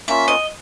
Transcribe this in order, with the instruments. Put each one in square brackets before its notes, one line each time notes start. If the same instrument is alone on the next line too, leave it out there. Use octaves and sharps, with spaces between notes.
[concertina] A#3 C#4 F4 [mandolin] E5
[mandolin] D#5